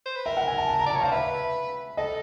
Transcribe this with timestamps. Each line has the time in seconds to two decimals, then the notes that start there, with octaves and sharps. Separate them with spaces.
0.06 C5
0.16 B4
0.26 A#4 E5
0.37 F#5
0.47 G#5
0.58 A5
0.68 A5
0.79 A#5
0.86 D5
0.90 C#5 A5
1.01 C5 F5
1.12 B4 E5
1.97 A4 D#5